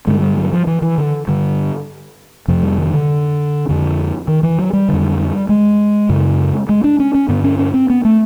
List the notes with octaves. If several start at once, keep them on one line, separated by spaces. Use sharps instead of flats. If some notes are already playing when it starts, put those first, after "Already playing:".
G2 D3 G#3
G3
F#3
F3
E3
E3
D3
G2 D3
F2 C3 F3
G3
D#3
D3
F2 D3
D#3
E3
F#3
G3
F2 D3
G#3
F#2 C#3
G#3
D4
C#4
C#4
G2 D3 B3
C#4
C#4
C4
B3
A3